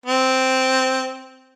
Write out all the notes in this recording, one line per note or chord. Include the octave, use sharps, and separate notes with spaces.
C4